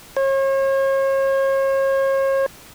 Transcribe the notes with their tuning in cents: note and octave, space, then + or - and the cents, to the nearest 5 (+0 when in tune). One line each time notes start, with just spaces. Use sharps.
C#5 -40